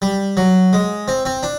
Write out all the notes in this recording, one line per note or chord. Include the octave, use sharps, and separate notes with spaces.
G3
F#3
G#3
C4
C4
D4